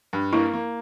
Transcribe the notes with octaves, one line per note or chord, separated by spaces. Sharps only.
G2
A#3 E4
A#3